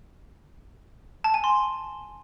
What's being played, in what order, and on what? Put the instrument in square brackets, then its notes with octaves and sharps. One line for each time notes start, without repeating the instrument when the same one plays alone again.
[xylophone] A5
G#5
C6